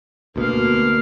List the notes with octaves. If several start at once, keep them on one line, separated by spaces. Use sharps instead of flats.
D2 B2 A#3 F5